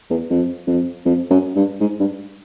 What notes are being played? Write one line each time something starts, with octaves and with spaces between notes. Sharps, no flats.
E2
F2
F2
F2
F#2
G2
G#2
G2